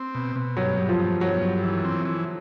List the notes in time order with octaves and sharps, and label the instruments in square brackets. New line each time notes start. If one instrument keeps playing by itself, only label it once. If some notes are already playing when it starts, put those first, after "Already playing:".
Already playing: [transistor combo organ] C4
B2
B2
[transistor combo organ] G2 [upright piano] F#3
[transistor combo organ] G2
[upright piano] F3
[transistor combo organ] G2
[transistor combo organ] G2 [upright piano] F#3
[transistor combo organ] G2
E3
C4
E3